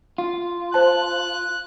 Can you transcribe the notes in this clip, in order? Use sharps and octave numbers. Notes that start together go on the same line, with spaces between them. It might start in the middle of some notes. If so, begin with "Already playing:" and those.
F4
C5 A5 F#6